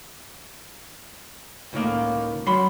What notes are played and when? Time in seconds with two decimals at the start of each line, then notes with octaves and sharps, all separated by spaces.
1.73 C#2 A2 D#3 A#3
2.47 F#3 B5 C6